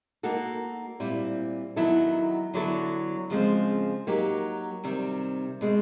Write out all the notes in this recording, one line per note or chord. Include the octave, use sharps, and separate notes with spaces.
A#3 D#4 F#4 A4
A#2 G3 C4 E4
D#3 F#3 B3 E4 A4
D3 F#3 B3 E4 A4
C#3 F3 G#3 C4
F#3 A#3 D#4 G4
C3 D#3 G3 C4
B2 G#3 C4